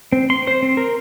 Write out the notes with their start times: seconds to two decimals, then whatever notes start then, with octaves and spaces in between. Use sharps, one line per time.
0.13 C4
0.30 C6
0.47 C5
0.63 C4
0.77 A#4